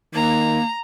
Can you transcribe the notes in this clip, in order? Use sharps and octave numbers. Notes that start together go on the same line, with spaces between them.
D#3 A#3 A#5